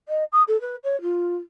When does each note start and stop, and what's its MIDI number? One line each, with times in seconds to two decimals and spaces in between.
0.09 0.24 75
0.32 0.43 87
0.48 0.60 69
0.61 0.76 71
0.84 1.00 73
1.02 1.36 65